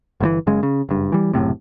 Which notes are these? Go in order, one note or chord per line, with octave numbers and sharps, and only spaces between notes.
G1 B2 E3
F#1 C#3 G#3
C#3
F#1 G2
E3 G3
F#1 F#2 A2 C3